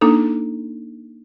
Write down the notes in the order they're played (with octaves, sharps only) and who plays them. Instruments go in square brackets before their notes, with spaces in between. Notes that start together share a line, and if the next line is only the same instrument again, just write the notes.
[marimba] A#3 D4 D#4 A4